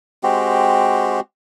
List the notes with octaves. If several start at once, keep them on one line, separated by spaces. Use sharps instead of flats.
G#3 C4 F#4 G4